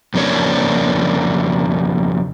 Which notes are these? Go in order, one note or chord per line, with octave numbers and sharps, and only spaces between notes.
F2 C#3 A#3 D4 C#5